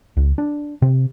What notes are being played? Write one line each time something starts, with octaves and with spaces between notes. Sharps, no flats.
C#2
D4
C3